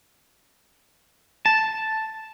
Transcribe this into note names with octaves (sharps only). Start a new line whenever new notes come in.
A5